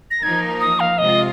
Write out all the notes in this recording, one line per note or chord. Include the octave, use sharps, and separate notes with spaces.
A#6
F3 A#3 D#4 A#4 G#6
D#6
F5
C3 G#3 F4 D#5